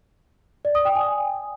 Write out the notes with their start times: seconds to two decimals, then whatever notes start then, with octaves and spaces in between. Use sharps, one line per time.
0.65 D5
0.75 D#6
0.85 G5
0.96 G#5